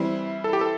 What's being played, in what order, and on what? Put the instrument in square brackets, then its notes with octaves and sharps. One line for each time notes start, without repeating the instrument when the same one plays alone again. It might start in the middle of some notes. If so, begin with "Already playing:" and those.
Already playing: [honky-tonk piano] E3 G3 C4 E4
[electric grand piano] A4
G4
A4